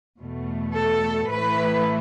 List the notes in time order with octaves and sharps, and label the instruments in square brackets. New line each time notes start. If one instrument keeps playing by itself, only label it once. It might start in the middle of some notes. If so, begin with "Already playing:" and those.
[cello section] E2 B2 A3
A4
A2 E3 A3 E4 B4